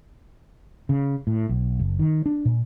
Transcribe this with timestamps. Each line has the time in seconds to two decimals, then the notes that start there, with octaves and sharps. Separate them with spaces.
0.89 C#3
1.27 A2
1.49 B1
1.79 F#1
1.99 D#3
2.26 D4
2.45 A#2